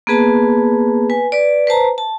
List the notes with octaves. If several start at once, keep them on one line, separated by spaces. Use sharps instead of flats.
A#3 B3 G#4 B4 A5
B4 G#5
B4 D5
B4 C5 A5 A#5
A5